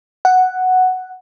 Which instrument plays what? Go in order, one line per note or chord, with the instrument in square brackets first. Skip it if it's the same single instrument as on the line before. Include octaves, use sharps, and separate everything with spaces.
[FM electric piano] F#5